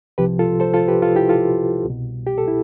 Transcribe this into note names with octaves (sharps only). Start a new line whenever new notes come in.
C2 C3 F3 G4 B4
F4 A4
A4 C5
F4 A4
G4 B4
F4 A4
E4 G4
F4 A4
C2 B2
G4
A4
E4